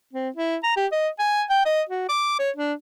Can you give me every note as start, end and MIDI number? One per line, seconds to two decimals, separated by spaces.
0.14 0.30 60
0.36 0.57 64
0.63 0.74 82
0.77 0.86 67
0.92 1.09 75
1.19 1.42 80
1.50 1.64 79
1.66 1.82 75
1.89 2.09 66
2.09 2.35 86
2.39 2.51 73
2.57 2.73 62